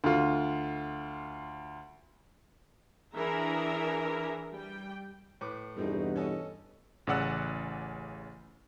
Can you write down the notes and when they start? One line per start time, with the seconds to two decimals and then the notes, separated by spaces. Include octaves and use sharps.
0.04 D2 F4
3.15 E3 D4 G#4 A#4 E5 A#5
4.51 G3 G5
5.41 A2 B4 D6
5.77 E2 G2 B2 A3 C4 D#4
6.16 C#4 A4 D#5
7.07 A1 C#3 D5 F#5 E6 F#6